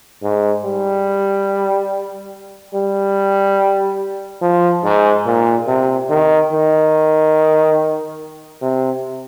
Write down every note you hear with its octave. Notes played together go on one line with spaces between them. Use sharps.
G#2
G3
G3
F3
G#2
A#2
C3
D#3
D#3
C3